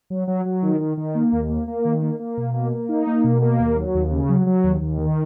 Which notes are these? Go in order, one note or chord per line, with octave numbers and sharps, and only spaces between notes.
F#3
F#3
F#3
D#3
D#3
D#3
A#3
D#2
A#3
A#3
D#3
A#3
A#3
B2
A#3
A#3
D#4
A#3
B2
A#3
D#2
F#3
D#2
C#3
F#3
F#3
D#2
D#2
D#3